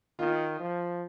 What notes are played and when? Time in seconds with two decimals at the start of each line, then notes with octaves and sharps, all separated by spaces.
0.19 D#3 F4
0.60 F3